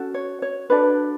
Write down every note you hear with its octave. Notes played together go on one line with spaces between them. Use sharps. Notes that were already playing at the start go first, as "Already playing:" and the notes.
Already playing: C#4 F#4 A4
C#5
C#5
D4 F#4 A4 B4 D5